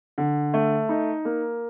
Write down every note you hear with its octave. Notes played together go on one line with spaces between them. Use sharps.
D3
A3
D#4
A#3